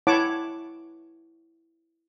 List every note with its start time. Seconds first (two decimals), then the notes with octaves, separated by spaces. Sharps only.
0.07 E4 C#5 F#5 A5 D6